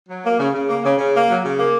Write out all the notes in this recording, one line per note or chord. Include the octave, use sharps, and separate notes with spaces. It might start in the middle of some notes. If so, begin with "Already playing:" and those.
F#3
A#3
C#3
C#3
A#3
C#3
C#3
A#3
F#3
C#3
A#3